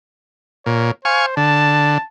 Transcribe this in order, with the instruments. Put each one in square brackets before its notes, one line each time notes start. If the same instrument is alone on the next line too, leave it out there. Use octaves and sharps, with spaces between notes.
[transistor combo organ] A#2 [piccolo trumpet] C#5
[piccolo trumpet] C5 [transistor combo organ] F5 G#5 C#6
[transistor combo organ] D3 [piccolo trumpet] A5